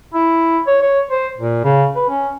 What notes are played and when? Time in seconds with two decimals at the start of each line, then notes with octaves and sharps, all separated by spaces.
0.14 E4
0.67 C#5
0.82 C#5
1.10 C5
1.38 A#2
1.64 C#3
1.96 B4
2.08 C#4